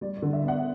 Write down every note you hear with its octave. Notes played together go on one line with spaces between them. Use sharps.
G3 D5
D5
D3
E5
B3 F#5